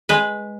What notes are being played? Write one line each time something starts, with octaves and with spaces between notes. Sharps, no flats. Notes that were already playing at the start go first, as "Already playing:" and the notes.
G#3 B4